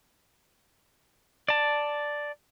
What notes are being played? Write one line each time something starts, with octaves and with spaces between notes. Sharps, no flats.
D5 A5